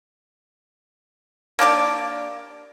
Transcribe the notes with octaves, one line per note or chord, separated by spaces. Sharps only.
A#3 D4 G4 D5